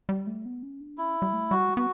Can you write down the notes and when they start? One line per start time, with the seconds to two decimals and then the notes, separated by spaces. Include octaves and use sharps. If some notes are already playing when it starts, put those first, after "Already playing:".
0.09 G3
0.27 A3
0.45 B3
0.63 C#4
0.81 D4
0.98 C#4 E4
1.22 G3
1.33 A3
1.51 G3 F#4
1.77 B3 F#4